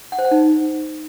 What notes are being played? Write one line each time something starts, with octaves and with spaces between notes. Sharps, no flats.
F#5
C5
F#5
D#4